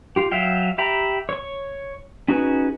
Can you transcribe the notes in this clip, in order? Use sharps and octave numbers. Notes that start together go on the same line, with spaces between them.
F4 G4
F#3 E5 F5 G5
G4 E5 G5 A#5 B5
C#5 C#6
C#4 D#4 F#4 G#4 B4